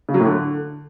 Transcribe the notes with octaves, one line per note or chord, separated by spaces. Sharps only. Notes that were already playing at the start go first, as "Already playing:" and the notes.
C#3
F#3
A2
D3